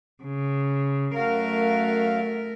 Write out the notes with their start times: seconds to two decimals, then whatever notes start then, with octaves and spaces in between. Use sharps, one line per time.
0.24 C#3
1.15 F#2 A3 F#4 A#4 F5